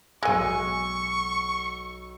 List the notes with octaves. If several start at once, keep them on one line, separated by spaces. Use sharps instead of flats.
B1 G#3 G#5 C#6 E6